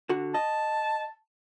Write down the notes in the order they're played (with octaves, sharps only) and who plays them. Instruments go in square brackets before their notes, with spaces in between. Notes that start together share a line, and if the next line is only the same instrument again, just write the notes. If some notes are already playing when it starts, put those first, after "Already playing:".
[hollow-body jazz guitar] D3 F#4
[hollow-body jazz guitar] D#5 [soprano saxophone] A5